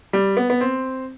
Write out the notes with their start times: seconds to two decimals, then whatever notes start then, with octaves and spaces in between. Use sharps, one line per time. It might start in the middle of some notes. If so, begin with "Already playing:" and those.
0.13 G3
0.37 B3
0.50 B3
0.61 C4